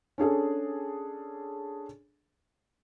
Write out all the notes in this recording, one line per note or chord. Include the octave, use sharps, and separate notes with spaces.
C#4 D4 G#4 A4